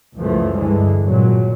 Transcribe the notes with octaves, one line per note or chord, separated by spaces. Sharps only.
C#2 F#2 E3 F3 A3
G2 D3 E3 G#3
G#1 A#2 F#3